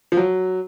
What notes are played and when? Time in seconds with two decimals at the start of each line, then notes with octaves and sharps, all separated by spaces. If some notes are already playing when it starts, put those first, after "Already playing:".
0.12 F3
0.17 F#3